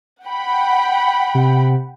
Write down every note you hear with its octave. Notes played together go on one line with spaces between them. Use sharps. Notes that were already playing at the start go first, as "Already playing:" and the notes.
F#5 G5 B5
C3